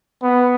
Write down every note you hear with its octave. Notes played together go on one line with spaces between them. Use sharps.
B3